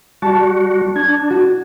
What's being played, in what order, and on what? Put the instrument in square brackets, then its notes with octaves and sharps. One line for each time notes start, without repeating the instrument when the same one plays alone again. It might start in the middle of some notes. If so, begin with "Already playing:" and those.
[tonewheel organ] G3 F#4 [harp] A5
[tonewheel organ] D4 [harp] G#6
[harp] F#4